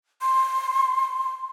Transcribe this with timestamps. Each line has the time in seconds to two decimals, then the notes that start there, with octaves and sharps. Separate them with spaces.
0.22 C6